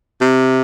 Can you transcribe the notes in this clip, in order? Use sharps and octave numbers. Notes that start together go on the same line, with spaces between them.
C3